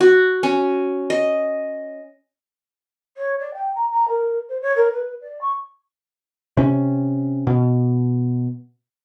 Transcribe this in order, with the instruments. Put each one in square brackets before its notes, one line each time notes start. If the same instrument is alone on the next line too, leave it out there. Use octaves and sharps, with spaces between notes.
[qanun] F#4
C#4
D#5
[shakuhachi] C#5
D5
G5
A#5
A#5
A#4
C5
C#5
A#4
B4
D5
C#6
[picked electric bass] C3 C#4
B2